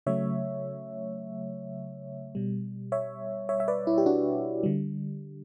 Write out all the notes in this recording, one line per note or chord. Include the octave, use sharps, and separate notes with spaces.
C#3 F#3 A3 C#5 E5
B2 G3
C#5 E5
C#5 E5
E5
B4 D5
E4
G4
D4 F#4
D3 G3